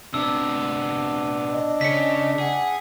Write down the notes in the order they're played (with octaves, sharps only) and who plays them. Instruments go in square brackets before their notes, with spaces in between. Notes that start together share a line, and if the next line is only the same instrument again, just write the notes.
[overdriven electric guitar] C3 B3 [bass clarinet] D4 [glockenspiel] E6
[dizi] D#5
[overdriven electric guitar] C#3 C#4 [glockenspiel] B6 C#7
[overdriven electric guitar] G#4 [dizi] F#5